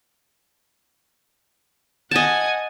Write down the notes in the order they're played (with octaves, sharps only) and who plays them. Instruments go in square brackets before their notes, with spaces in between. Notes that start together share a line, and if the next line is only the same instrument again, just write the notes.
[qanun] D#5 A5 [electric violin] F#5 G#5